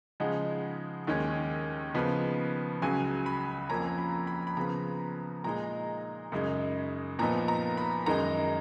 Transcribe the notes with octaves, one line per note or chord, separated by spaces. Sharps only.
C#3 F3 G#3 D#4 F#5
D#2 D#3 G#3 C#4
C#3 F3 B3 D#4
C#2 C#3 F#3 G#5
B5
F2 F3 A#3 C#4 A#5
B5
B5
B5
C#3 F3 B3 A#5
A#2 G#3 D#4 A#5
F#2 C#3 G#3 D#4
A#2 F3 B3 D#4 A#5
A#5
B5
F#2 D#3 G#3 D#4 A#5